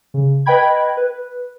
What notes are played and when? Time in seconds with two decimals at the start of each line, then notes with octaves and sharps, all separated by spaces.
0.14 C#3
0.46 B4 D#5 G5 B5 G#6
0.97 B4